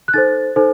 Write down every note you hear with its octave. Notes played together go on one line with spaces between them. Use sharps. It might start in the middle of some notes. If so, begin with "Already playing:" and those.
F#6
D#4 A4 C5 A6
D#4 A4 C5